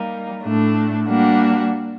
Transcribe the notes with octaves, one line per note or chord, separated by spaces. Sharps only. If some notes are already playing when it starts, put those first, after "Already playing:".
Already playing: G3 A#3 D#4
A2 A3 D4 A4
G3 A#3 D4 F#4